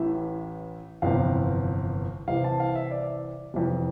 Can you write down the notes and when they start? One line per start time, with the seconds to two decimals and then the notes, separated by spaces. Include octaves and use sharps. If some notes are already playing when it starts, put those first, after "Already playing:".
Already playing: A1 A2 E3 E5
1.02 G1 F2 C3 E3 F5
2.28 C2 C3 E3 F5
2.44 A5
2.60 F5
2.75 E5
2.91 D5
3.54 F1 F2 E3